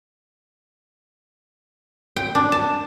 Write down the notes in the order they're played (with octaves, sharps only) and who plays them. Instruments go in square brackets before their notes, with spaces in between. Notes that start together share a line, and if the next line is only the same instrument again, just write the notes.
[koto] G5
D4
A5